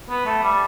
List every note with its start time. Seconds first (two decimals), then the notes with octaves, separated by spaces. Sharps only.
0.09 B3
0.26 A3
0.43 G3